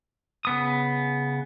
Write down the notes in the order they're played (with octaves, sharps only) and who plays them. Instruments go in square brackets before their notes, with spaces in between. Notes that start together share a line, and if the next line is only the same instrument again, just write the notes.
[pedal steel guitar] C#3 B3 D#6